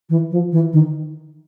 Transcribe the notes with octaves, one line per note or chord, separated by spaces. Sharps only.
E3
F3
E3
D#3